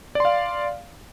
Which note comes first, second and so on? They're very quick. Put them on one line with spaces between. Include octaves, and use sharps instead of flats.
D5 C6 F5